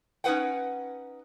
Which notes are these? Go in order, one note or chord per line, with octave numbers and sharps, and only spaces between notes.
C#4 D#4 E4 B4 F#5 G5